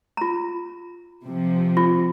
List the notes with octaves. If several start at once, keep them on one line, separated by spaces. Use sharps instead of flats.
F4 A#5
C3 F3
F4